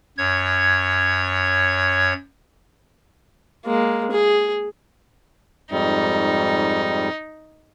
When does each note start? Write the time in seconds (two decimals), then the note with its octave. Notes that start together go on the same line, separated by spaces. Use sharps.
0.18 F#2 C#5 G#6
3.65 G#3 A#3
4.11 G#4
5.71 F2 G#2 G3 D#4